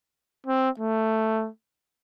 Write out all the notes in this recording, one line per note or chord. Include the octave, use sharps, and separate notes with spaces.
C4
A3